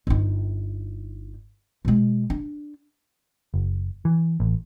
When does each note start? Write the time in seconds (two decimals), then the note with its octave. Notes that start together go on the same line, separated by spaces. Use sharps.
0.07 G1 D#4
1.85 B2 G#3
2.30 D4
3.54 F#1
4.05 E3
4.40 A1